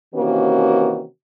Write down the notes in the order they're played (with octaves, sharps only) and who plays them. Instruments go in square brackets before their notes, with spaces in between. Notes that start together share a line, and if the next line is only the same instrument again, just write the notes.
[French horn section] C3 D#3 E3 A#3 C#4 F#4